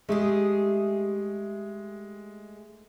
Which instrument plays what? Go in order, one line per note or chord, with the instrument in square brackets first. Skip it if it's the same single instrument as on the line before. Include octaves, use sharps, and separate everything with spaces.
[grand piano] G#3 [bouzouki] A3 G4 G#4